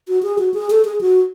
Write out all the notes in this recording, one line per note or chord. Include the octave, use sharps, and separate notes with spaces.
F#4
G#4
F#4
G#4
A4
G#4
F#4